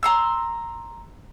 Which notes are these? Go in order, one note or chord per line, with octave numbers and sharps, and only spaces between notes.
A#5 C6 E6